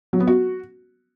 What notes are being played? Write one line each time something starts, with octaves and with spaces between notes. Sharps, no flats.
F#3
B3
F#4